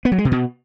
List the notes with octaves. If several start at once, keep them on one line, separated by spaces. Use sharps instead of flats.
B3
F#3
G#3
C3
B2